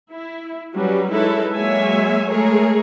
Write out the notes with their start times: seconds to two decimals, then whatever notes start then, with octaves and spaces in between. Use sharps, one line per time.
0.12 E4
0.73 F#3 G3 C#4 B4
1.10 G#3 D#4 E4 A4 B4 C#5
1.52 F#3 G#3 A#3 C#5 E5 G#5
2.27 G#3 A3 G#4 A#4 C#5